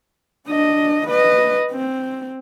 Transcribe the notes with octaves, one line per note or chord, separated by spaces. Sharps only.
D4 D#5
B4 D#5
C4